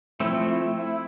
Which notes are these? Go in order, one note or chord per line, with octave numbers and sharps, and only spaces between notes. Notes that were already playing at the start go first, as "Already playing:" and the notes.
F3 A3 C4 E4
E4
E4